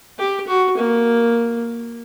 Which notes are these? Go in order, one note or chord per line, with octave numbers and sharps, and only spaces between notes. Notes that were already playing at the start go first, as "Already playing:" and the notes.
G4
F#4
A#3